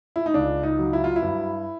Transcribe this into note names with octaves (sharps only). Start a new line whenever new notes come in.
E4
D#4
C#2 D4
D#4
F#3
E4
F4
E4
G2